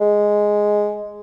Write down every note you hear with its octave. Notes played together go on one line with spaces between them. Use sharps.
G#3